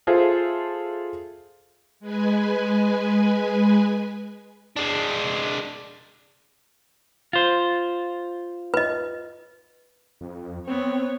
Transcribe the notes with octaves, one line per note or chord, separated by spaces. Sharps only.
F4 G#4 A4 C5 E5
G#3 B4 G#5
G#3 D4
F4 C5
B4 D#5
F2
B3 C4 C#5